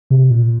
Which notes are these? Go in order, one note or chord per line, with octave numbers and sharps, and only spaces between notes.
C3
A#2